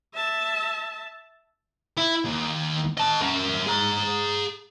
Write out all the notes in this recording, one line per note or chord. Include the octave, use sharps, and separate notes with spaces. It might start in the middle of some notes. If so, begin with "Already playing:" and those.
E5 A5
E4
D#2
D#5 A5
C#4 A#4
G#4 A#5